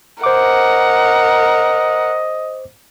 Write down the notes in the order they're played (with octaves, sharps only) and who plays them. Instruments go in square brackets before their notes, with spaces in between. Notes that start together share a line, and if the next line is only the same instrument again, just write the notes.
[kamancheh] A#4 F#5 [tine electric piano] C5 D6 [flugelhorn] D#5